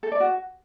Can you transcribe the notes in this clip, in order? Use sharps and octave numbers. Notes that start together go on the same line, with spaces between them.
A4
D5
F#4